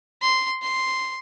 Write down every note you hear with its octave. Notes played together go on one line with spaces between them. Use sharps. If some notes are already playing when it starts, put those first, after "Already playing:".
C6
C6